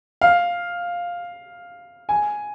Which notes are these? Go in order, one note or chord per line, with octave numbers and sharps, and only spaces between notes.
F5
G#5